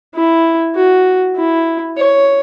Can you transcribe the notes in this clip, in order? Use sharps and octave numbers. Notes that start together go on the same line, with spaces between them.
E4
F#4
E4
C#5